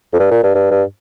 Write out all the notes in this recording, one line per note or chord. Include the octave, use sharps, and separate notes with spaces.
F2
G2
A#2
G2
G2
G2